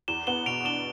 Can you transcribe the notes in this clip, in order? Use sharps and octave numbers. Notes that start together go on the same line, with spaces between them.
E2 E7 G7
B3 E7 G7
B2 D7 F7
D4 E7 G7